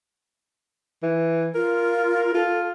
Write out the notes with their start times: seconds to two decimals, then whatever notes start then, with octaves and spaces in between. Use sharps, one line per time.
1.03 E3
1.55 F4 A#4
2.34 F4 A4